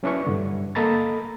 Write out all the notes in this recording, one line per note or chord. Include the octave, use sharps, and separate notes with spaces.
F#3 C#4 D4 E4 B4 C#6
G2 D3
A#3 A4 D#5 A#5 B5 A6